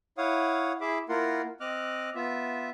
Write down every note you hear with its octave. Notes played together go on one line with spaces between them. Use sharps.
E4 C#5 F5 F#5 D#6
E4 G#4 E5 B5 D6
A#3 E4 F4 A#4 F#5 C6
C4 D#5 D6 F6 F#6
B3 F4 E5